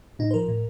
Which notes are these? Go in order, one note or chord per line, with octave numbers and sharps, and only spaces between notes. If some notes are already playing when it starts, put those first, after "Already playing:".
A2 D#4
C5
F3 A#4
A2